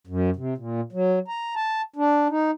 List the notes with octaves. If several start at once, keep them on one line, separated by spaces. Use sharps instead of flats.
F#2
C3
A#2
F#3
A#5
A5
D4
D#4